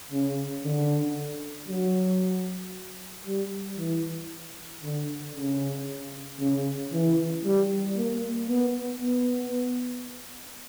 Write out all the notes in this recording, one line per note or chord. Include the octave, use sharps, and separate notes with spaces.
C#3
D3
F#3
G3
E3
D3
C#3
C#3
E3
G3
A#3
B3
B3